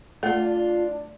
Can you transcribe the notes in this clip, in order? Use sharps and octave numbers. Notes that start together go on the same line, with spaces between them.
A3 D4 F4 A4 C#5 F#5